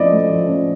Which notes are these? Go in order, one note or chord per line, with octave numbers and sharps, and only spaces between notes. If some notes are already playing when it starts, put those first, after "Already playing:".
Already playing: F3 A3 C#4 E4 D5 D#5
A3
F3
C#4